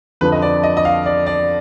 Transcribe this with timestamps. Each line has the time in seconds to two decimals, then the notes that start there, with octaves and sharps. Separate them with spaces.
0.21 F2 D3 F3 B4
0.32 D#5
0.42 D5
0.63 D#5
0.77 D#5
0.85 F5
1.06 D5
1.26 D5